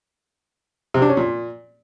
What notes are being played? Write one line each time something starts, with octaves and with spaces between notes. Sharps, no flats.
C3
D4
C#4
A#2